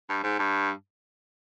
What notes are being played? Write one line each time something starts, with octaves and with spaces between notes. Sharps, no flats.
G2
G#2
G2